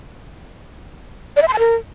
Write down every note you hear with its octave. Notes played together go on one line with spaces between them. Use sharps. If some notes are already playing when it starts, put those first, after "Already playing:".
D5
E5
C6
A5
A#4